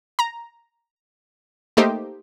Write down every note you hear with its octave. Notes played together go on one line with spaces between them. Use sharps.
A#5
A3 A#3 D#4 G4 C5